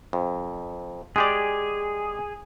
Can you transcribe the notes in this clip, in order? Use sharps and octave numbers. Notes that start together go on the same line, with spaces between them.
F2
G#3 G4 G#4 D5